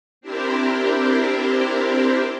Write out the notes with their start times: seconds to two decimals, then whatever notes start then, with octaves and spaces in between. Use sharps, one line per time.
0.21 C4 D4 E4 G4 A#4 C5